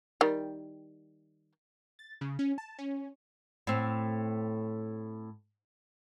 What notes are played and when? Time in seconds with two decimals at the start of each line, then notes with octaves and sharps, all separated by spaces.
0.21 D#3 G3
1.99 A6
2.21 C#3
2.39 C#4
2.58 A5
2.79 C#4
3.67 A2 C4